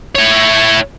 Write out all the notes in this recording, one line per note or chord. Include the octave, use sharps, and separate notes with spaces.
E4 C#5